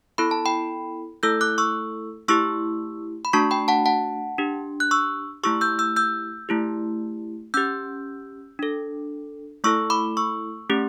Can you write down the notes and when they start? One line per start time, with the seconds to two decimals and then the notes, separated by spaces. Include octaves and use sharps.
0.18 B3 E4 A4 B5
0.31 A5
0.46 G5 B5
1.23 A3 E4 A4 E6 G6
1.41 D6 F#6
1.58 C#6 E6
2.28 A3 E4 G4 C#6 E6
3.25 B5
3.33 A3 D4 F#4 A5 C#6
3.51 G5 B5
3.68 F#5 A5
3.86 F#5 A5
4.38 D4 G4
4.80 F#6
4.91 C#6 E6
5.44 A3 E4 G4 C#6 E6
5.61 E6 G6
5.79 E6 G6
5.96 E6 G6
6.49 A3 E4 G4
7.54 C#4 G4 E6 G6
8.59 D4 A4
9.64 A3 E4 A4 C#6 E6
9.90 B5 D6
10.17 C#6 E6
10.69 A3 C#4 G4